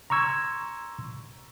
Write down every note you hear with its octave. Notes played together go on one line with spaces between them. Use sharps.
A#5 C6 C#6 E6 G#6